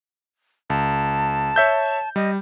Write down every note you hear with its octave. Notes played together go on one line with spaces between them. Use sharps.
C#2 A5
C#5 E5 G6
G3 D#5